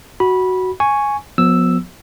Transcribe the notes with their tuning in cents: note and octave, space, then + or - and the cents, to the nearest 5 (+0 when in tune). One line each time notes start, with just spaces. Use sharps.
F#4 +5 B5 -15
G#5 +0 C#6 +0
F3 +40 B3 +0 E6 +0